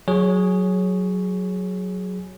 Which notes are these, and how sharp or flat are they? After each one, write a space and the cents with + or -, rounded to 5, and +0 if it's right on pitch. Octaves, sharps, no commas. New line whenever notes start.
F#3 -5 G#4 +5 C#5 +0